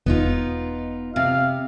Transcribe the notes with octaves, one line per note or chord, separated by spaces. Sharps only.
E1 B3 D#4 F4
C3 F5